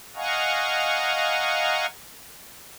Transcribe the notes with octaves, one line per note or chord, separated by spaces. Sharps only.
D#5 F5 F#5 G#5 A#5 C#6